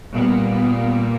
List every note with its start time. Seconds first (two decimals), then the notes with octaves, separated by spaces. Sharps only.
0.16 A#2 G3 A#3 B3
0.53 B3